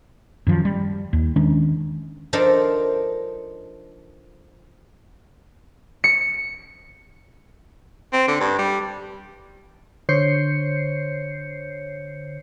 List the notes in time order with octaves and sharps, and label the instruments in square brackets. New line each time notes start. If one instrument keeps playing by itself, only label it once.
[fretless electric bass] F#2 D#3 F3
G3
D#2
D#3 G#3 C#4 D4
[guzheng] F3 D4 D#4 A4 A#4 C5
[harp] C#7
[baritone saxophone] C4
D3
G2
G3
[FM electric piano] D3 C5 C#5 G6 C7 C#7